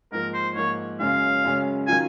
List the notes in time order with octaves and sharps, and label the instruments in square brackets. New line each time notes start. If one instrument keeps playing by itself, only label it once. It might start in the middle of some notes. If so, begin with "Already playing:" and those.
[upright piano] G#2 F3 A#3 [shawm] A#4
[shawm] C5
[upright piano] G#2 F3 A#3 [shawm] C#5
[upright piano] F#2 C#3 G#3 C#4 [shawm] F5
[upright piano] F#2 C#3 G#3 C#4
[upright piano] D#3 F#3 C#4 F4 [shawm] G#5